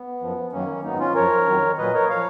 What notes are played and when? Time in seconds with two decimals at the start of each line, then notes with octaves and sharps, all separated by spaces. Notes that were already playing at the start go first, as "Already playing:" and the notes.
Already playing: B3
0.22 F#2 F3
0.52 F#2 D#3 F#3 A#3 C#4
0.84 G#2 D#3 F#3 B3 D#4
0.99 C#4 F4
1.15 F#2 F3 A#4 C#5
1.46 F2 D#3 F#3
1.78 A#2 F#3 B4 D#5
1.94 A#4 C#5
2.09 F3 C#5 F5